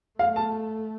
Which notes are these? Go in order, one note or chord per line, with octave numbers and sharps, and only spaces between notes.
A3 F5
A5